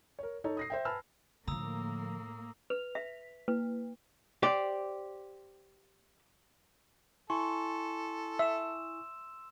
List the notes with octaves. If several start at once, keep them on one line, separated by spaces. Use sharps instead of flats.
A#4 C#5
D#4 A4 C#5
D#6 A#6 C7
C5 E5 G5
B4 G#5 A5 B5 E6 F6
A2 D3 F3 A#3 A#5 D#6 E6
B4 F7
E5 B6
A#3 B4
G4 C5 D5
E4 A4 G#5 C6 C#6
E5 E6 E7